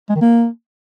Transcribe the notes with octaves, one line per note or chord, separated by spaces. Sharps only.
G#3
D#3
A#3